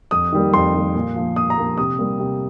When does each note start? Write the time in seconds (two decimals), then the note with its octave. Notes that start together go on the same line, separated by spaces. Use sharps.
0.11 F2 D#6
0.32 D#3 G3 A#3
0.53 F2 C6
0.74 D#3 G3 A#3
0.95 A#2
1.16 F3 A#3
1.36 A#2 D#6
1.50 A#5
1.58 F3 A#3
1.78 C3 D#6
1.99 G3 A#3
2.20 C3